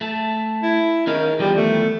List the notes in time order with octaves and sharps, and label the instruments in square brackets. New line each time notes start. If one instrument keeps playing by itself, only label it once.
[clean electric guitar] A3 A4
[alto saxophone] E4
[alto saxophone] D#3 [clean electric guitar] C#4 G#4 F5
[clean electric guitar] E2 D#3 F3 [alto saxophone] G3
[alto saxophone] A3